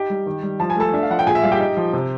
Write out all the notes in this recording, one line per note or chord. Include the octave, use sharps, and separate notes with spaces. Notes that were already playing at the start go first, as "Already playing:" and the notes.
Already playing: D#4 G4 G5
G3
D#3
G3
F3 A5
G#5
A3 A4 A5
D4 E5
F5
F3 F#5
G5
A#2 G#4 G#5
E5
G3 F5
G4 G5
D#4
F3
C3